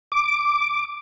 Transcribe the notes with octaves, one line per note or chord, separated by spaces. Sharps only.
D6